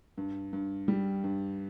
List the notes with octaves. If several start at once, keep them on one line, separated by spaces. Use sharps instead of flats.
G2
G2
G3
G2